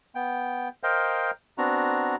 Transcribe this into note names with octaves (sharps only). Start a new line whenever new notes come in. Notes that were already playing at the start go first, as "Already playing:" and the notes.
B3 G5
A#4 C5 D#5 F5 G5
B3 C4 D4 F#4 A#5